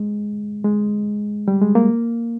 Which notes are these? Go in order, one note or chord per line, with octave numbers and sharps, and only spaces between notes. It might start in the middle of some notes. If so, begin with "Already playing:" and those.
Already playing: G#3
G#3
G3
G#3
A#3